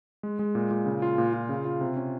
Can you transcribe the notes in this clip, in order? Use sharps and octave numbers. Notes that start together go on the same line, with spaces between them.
G#3
G#3
A#2
A#2
C#3
F4
A#2
F4
C#3
F4
C3
C#4